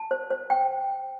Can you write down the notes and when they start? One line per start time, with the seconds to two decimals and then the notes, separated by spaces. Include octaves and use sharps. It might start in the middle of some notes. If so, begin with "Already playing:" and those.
Already playing: A5
0.11 C5
0.31 C5
0.50 G5